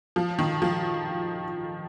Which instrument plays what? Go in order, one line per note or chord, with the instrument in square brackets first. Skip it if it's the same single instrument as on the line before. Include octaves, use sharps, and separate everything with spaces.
[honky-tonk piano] F3
D#3
F3